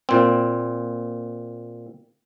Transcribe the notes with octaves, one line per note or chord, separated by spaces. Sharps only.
A#2 C4